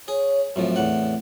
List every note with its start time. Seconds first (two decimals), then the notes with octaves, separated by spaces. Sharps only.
0.08 G#4 C#5
0.56 F#2 A2 F3 C4
0.76 E2 A2 F#5